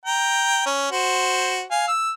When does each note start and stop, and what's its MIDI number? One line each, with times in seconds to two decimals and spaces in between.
0.06 0.66 79
0.06 0.66 82
0.66 0.90 61
0.91 1.63 66
0.91 1.63 72
1.71 1.88 77
1.71 1.88 80
1.88 2.12 88